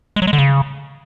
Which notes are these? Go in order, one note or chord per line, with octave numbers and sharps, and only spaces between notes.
G#3
F#3
G#3
D3
C#3